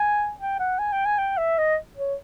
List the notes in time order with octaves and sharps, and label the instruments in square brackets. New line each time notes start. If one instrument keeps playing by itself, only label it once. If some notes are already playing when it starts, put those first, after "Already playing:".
Already playing: [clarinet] G#5
G5
F#5
G#5
G5
G#5
G5
E5
D#5
C#5